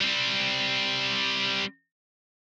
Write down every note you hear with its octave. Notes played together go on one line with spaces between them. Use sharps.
G3 C4